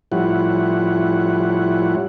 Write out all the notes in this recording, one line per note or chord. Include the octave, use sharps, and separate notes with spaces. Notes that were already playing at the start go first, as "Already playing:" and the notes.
A2 F3 G3 C#4 E4 F#5